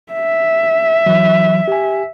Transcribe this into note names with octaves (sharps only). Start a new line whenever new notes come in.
E5
E3 F#3
G4 G#5